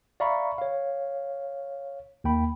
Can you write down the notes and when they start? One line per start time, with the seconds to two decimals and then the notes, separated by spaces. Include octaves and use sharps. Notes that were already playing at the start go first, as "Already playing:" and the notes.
0.20 D5 E5 F5 A#5 B5 C#6
0.58 C#5 F5
2.24 D#2 A#3 G5 B5